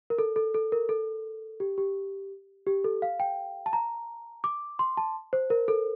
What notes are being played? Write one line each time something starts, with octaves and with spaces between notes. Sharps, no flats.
A#4
A4
A4
A4
A#4
A4
G4
G4
G4
A4
F5
G5
A5
A#5
D6
C6
A5
C5
A#4
A4